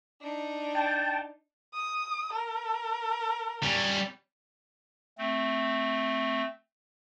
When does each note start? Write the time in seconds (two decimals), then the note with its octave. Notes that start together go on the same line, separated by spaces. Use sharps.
0.21 D4 D#4
0.75 G5 A5
1.73 D#6
2.33 A#4
3.63 G3 C#4
5.18 A3 C4